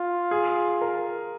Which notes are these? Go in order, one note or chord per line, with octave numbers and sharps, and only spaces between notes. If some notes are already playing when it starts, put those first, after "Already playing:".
Already playing: F4
G#4
A#4